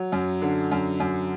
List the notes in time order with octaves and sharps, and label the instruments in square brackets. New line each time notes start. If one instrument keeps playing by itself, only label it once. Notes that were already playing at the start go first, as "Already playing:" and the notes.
Already playing: [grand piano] F#3
F#2
D3
F#2
F#2